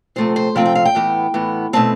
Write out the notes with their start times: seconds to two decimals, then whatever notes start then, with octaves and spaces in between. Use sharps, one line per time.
0.16 C3 F3 A3 C4 C5
0.36 C5
0.55 C3 F3 A3 C4 G5
0.66 G5
0.75 F5
0.85 G5
0.95 A2 E3 B3
1.34 A2 E3 B3
1.73 B2 A3 C4 A5